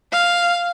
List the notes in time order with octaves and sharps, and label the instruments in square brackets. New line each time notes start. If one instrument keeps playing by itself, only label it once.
[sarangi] F5